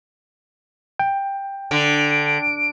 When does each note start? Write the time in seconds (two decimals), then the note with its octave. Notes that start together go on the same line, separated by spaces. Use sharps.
0.99 G5
1.71 D3 D7